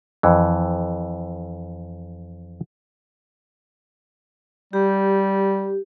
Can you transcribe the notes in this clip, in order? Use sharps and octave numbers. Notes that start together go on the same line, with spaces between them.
F2 E3
G3 G4